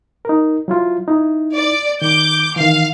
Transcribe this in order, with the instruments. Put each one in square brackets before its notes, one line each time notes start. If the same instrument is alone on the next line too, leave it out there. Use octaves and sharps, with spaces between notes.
[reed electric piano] D#4 A#4
F#3 E4 F4
D#4 E4
[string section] D5
[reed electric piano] D#3 [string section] D6 G6
[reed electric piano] D#3 E3 [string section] F5